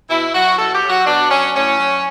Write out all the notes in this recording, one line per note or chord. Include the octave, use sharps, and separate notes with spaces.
B2 E4
F#3 F#4
B2 A4
G4
F#3
F#4
B2 D4
F#3 C#4
A2 C#4
F#3